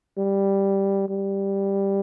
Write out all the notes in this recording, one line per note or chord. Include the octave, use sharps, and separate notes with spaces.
G3
G3